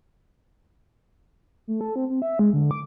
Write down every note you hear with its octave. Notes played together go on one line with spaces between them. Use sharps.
A3
A4
C4
C4
E5
G#3
D3
D6